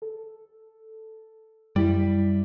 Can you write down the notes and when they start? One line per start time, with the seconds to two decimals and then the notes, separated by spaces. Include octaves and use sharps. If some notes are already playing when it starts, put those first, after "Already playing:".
0.02 A4
1.76 F#2 G3 E4 B6